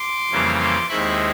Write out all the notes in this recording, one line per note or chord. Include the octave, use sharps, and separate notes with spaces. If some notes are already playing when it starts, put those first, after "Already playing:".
Already playing: C6 D6
F2 C#3 E3 G3 A#3
C6 D6
D#2 D#3 G#3 C4 E4 B5 C#6